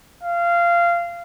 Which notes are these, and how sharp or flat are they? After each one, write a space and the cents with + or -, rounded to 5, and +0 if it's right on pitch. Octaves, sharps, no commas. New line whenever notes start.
F5 -20